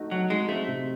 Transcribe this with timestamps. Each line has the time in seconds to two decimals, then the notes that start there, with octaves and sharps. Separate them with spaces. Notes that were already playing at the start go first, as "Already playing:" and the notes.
Already playing: A3 D#4 F#4 A4
0.11 F#3 F#4
0.30 G#3 D#4
0.49 A3 C4
0.68 C3